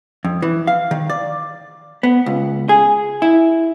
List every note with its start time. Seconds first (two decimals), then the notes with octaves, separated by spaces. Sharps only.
0.25 F2
0.42 E3
0.67 F5
0.91 D#3
1.10 D5
2.03 B3
2.26 C#2
2.69 G#4
3.22 E4